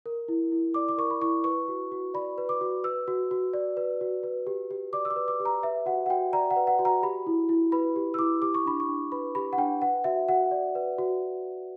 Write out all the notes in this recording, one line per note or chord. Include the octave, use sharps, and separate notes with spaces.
A#4
E4
E4
D5 D6
D6
A#4 C#6
B5
E4 C#6
B4 C#6
F#4
F#4
D5 B5
B4
D6
F#4
B4 E6
F#4
F#4
D5
B4
F#4
B4
G4
G4
D5 D6
E6
D6
B4
D6
G4
A#5
B4 E5
F#4 F#5
F#5
F#4 G5
D5 A#5
F#5
B4
F#5
F#4
A#5
G4 B5
E4
E4
B4 B5
G4
E6
E4 D6
G4 D6
C#6
D4 B5
C#6
D4
B4 B5
G4 B5
F#5
D4 G5
B4 F#5
F#4 E5
F#4 F#5
D5
B4
F#4